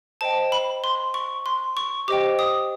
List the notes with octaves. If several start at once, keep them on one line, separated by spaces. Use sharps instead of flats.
C5 D#5 G5 A5
B5
C6
C#6
C6
C#6
G4 C5 D#5 G5 D6
D#6